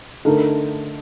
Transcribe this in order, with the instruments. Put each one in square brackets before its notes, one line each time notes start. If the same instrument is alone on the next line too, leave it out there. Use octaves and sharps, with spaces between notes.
[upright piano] D3 A3 D#4 A#4